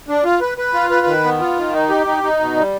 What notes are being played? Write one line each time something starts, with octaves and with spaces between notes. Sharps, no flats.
D4
F4
B4
B4
F4
B4
D#3
B3
F4
D#3
D#4
G4
D#4
D#4
B2
G3